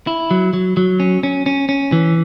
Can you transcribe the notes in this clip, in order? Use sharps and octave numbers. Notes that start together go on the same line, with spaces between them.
E4
F#3
F#3
F#3
C#4
C#4
C#4
C#4
E3